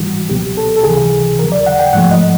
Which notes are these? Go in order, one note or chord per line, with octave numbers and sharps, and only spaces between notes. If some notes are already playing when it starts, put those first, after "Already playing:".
Already playing: G#2 E3 G3 F#4
C#2 B2 F#3 B3 G4
A4
A4
C#2 C3 E3 G#4
D#2 C#3 F#3 A#4
D5
F#5
G5
G#2 F3 A3 F#5
D#5